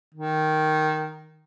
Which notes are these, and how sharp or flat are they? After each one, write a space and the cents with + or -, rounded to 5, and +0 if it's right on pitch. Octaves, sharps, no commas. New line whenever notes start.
D#3 -5